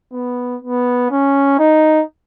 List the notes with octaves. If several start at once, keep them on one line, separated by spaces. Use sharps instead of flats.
B3
B3
C#4
D#4